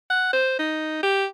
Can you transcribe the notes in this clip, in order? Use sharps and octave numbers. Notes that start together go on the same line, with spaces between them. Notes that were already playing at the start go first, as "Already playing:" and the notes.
F#5
C5
D#4
G4